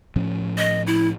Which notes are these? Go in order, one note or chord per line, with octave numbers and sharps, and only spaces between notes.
A2 F3 C#4
D#5
E4